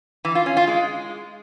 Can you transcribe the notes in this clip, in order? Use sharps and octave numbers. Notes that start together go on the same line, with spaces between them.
E3
F4
C#4
F4
G#3